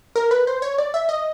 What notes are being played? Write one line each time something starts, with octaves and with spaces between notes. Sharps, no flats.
A#4
B4
C5
C#5
D5
E5
D#5